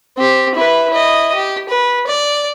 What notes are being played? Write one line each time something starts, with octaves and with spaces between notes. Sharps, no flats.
C4 G4
E4 B4
E4 D#5
G4
B4
D5